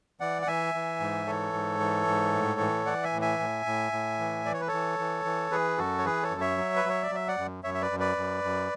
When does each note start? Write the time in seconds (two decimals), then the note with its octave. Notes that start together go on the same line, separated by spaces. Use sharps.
0.20 E3 D5 F#5
0.42 F#5
0.47 E3 E5 G#5
0.74 E3
1.00 G#2
1.27 E3 A4 C#5
1.53 G#2
1.80 E3
2.07 G#2
2.34 A2
2.60 E3
2.86 E3 D5 F#5
3.03 E5 G#5
3.13 A2
3.22 E5 G#5
3.39 A2
3.66 A2
3.92 A2
4.19 E3
4.45 E3 D5
4.54 C#5
4.61 B4
4.68 E3 A4 C#5
4.99 E3
5.25 E3
5.51 E3 G#4 B4
5.78 F#2 F#4 A4
5.98 C#5
6.05 E3 G#4 B4
6.23 A4 C#5
6.31 F#2
6.41 C#5 E5
6.57 F#3
6.76 B4
6.85 F#3 C#5
7.03 D5
7.11 F#3 E5
7.28 D5 F#5
7.38 F#2
7.64 F#2 C#5 E5
7.74 E5
7.82 B4 D5
7.91 F#2
7.99 B4 D5
8.17 F#2
8.44 F#2